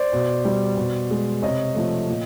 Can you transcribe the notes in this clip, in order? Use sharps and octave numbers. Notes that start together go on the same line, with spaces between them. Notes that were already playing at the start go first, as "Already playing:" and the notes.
Already playing: C5 D5
B2
G3
B2
G#3
C3 C#5 D#5
F3 A3
A#2